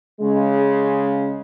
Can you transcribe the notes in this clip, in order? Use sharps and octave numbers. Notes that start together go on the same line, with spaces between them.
C#3 G#3